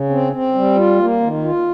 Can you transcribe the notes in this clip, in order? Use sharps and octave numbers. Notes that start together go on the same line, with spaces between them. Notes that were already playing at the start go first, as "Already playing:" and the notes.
Already playing: C#3
C4
C4
G3
F4
A#3
D#3
F4